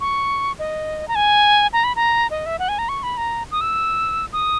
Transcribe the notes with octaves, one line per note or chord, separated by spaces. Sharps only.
C#6
D#5
A#5
G#5
A#5
B5
A#5
D#5
E5
F#5
G#5
A#5
C#6
B5
A#5
D#6
E6
D#6